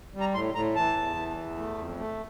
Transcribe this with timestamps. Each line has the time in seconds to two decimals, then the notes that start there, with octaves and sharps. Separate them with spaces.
0.14 G3
0.20 A#5
0.34 A2 C6
0.54 A2 A#5
0.75 E3 A5
0.96 E2
1.16 E3
1.37 E2
1.57 A3
1.78 F2
1.98 A3